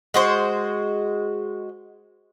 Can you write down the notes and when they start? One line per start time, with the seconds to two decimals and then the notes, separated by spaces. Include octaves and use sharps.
0.14 G#3 F#4 C5